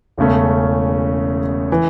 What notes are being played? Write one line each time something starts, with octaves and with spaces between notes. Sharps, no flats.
E1 E2 C#3 A3 C#4
E3